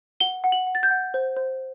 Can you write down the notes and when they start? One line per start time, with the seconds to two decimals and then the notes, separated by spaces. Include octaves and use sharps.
0.20 F#5 G7
0.44 F#5
0.52 F#7
0.67 F#5
0.75 A6
0.83 G6
0.91 F#5
1.14 C5
1.37 C5